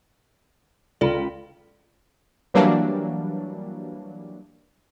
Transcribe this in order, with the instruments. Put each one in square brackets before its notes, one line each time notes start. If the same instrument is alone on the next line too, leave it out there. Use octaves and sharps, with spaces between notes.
[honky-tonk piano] C#2 [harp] F4 B5 [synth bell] A4 D5
[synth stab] E3 F#3 G3 A#3 D4